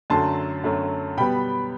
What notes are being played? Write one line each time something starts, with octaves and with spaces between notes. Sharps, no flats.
F#2 D3 F#3 A3 A5 C6
F#2 D3 F#3 A3
B2 G3 B3 G5 B5